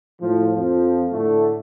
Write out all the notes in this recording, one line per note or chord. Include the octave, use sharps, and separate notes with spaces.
A2 F3
F2 F3
A2 D3 A3